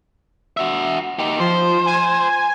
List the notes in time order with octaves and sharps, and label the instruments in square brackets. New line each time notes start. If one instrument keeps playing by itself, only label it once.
[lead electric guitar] F#4 E5
D#4 G4
[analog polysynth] F3 [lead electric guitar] C5
[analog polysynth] G#5